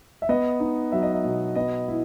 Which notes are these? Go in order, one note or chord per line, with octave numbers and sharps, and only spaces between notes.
E5
B3 D#5
D#4
F#3 E5
D#5
E5
B2
B3 D#5
E4